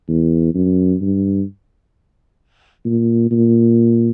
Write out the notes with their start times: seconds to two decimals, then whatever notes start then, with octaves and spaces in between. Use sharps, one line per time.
0.09 E2
0.55 F#2
1.01 G2
2.85 A#2
3.31 A#2